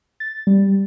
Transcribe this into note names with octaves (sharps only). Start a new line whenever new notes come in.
A6
G3